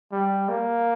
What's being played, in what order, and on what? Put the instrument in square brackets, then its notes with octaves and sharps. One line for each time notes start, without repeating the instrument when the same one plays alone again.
[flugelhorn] G3
A#3